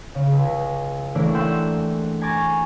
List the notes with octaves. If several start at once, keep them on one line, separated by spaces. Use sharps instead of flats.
C#3
C#2
E3 A3 A#3 C#4 D4 E4
E5 F#5 G5 C6 E6
G#5 A#5 C#6 D6 G#6 A6